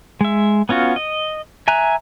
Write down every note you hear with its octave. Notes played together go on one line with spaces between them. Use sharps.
G#3 E5
B3 C#4 F4 F#4
D#5
E5 G#5 A#5 F#6